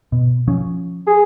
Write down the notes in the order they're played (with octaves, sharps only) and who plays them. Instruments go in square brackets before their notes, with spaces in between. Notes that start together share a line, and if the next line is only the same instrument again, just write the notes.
[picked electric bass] B2
F3 C#4
[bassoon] G#4